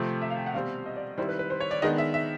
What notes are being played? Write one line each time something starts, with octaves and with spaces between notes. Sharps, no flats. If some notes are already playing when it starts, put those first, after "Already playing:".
Already playing: C3 F3 A3 C4
E5
F5
G5
F#5
B2 G3 C4 F5
D#5
D5
D#3 G3 C4 E4 C5
B4
B4
C5
C#5
D5
D#3 G#3 B3 D4 D#5
E5
E5